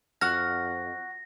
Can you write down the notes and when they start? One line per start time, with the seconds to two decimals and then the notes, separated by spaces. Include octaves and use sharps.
0.21 F2 F#4 F#5 F6 A#6